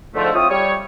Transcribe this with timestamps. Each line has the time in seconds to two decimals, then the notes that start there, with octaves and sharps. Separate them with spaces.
0.15 G#2 D3 F3 A3
0.35 C4 E4 F4 C#5 D#6
0.50 G3 C#5